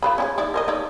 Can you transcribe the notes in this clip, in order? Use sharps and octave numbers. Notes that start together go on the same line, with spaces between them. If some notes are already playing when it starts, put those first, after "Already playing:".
F4 B4 B5
C#4 E4 G#4
D#4 E4 D5
A#4 C5 D#5
D#4 C#5 D5